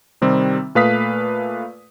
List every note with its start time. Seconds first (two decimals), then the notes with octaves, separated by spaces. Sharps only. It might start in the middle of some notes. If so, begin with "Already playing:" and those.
0.22 C3 D#3 G3 C4
0.75 A#2 A3 B4 F5 D#6 B6